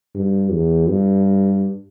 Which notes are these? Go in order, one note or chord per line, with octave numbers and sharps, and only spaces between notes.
G2
E2
G2